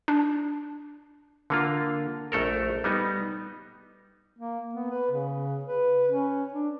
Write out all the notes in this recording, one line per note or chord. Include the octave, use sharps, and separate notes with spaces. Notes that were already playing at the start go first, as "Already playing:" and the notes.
D4
D3 A#3 F4
A#1 A3 A4 A#4
G3 B3 D#4
A#3
B3
B4
C#3
B4
C#4
D4